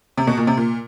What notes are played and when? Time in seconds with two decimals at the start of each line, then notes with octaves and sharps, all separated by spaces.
0.18 C3
0.27 B2
0.37 A#2
0.47 C3
0.57 A#2